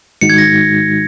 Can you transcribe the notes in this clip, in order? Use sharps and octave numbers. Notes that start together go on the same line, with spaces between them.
G#2 D#3 G#3 D#4 F#4 C#7
G#6
A#6